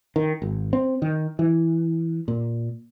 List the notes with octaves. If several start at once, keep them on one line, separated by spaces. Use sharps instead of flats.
D#3
G#1
C4
D#3
E3
A#2